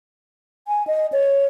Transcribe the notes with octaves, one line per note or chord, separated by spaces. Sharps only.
G#5
D#5
C#5